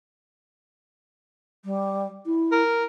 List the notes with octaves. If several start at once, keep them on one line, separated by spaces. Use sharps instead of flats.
G3
E4
A#4